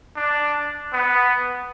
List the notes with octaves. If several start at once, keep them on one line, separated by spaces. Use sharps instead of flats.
D4
B3